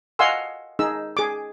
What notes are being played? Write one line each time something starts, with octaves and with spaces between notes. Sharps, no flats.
D#5 F5 F#5 G#5 C6 E6
D#4 G#4 E6
G#4 D6